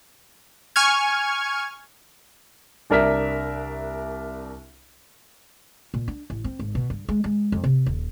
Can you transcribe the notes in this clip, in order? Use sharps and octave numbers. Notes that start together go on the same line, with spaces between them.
G#5 C#6 F6 G#6
C2 D4 A#4 E5 B6
A#2
D4
A1
C4
G#1
B2
G2
G#3
G#3
F2
C3
D#1